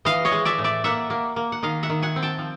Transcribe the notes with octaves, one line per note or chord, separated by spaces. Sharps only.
E3 D#5 F5
C#5 D#5
G#3
D5 E5
A2
D5 E5
A#3 E5 F#5
A#3
A#3
F#5
D#3 D#5 F5
E5 F#5
D#3
F#5 G#5
C4
G5 A5
F3